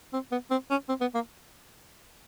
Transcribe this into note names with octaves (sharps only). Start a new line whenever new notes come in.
C4
B3
C4
C#4
C4
B3
A#3